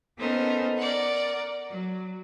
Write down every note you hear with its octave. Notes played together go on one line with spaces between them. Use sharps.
B3 C#4 D#4 A4 A#4 C5
A#4 D5 F#5
F#3